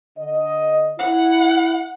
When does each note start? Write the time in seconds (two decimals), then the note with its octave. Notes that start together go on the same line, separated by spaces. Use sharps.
0.18 D3 D#5
0.99 E4 F#5